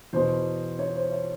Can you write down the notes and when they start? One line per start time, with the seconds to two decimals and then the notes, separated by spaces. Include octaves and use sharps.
0.13 E2 B2 C5
0.79 C#5
0.95 C5
1.11 C#5